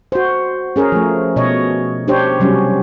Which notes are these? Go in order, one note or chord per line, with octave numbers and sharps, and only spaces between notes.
F#4 C5
C#4 G#4 A#4
F3 A3
B2 C#5 D#5
D4 G4 C5 C#5
C3 F#3 G3 C#4